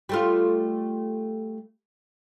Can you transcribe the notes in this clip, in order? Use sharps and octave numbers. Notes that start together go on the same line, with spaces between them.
G3 A3 F4